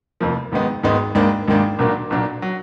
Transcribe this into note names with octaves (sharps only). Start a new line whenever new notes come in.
F1 F2 F3 A#3
G#1 G#2 D#3 G#3 B3
G#1 G#2 D#3 G#3 B3
G#1 G#2 D#3 A#3 D4
G#1 G#2 D#3 A#3 D4
B1 A#2 F#3 A#3 D4
B1 A#2 F#3 A#3 D4
F#3